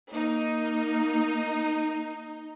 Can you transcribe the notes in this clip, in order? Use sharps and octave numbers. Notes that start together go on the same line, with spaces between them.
A#3 D#4